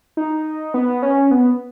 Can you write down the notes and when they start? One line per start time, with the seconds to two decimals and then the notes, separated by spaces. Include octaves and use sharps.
0.17 D#4
0.74 B3
1.02 C#4
1.31 B3